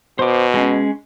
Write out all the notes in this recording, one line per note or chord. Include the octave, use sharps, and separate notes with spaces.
B2 C5 D6
G#3 C#4